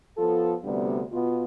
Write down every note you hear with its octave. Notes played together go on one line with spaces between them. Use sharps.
F3 B3 F4 A4
D2 C3 G3 B3 D4
B2 B3 F4